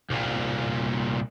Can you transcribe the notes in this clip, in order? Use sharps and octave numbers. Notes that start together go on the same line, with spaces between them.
C2 A#2